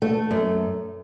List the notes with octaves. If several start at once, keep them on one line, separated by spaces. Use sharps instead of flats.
A3
F#2